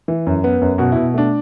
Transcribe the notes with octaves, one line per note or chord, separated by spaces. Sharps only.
E3
F#2
B3
F#2
B2 F#4
B2 E4
A3 D4